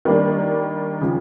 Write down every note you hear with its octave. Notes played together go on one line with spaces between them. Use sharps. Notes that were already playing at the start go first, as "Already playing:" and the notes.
D#3 G3 A#3 D4
C#3 F3